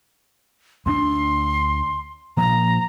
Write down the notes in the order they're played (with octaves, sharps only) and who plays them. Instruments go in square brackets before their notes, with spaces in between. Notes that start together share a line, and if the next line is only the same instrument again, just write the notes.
[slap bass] D2 G#3 D4 [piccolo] C6
[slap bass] A#2 F3 [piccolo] A#5